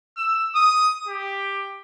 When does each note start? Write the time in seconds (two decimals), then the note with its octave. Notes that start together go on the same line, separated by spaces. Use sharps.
0.17 E6
0.55 D#6
1.07 G4